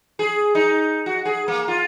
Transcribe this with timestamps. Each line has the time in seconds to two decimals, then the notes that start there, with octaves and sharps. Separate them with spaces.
0.19 G#4
0.55 D#4
1.06 F#4
1.25 G#4
1.48 A#3
1.68 F4